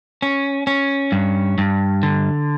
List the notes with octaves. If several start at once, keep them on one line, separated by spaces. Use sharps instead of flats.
C#4
C#4
G2
G2
D3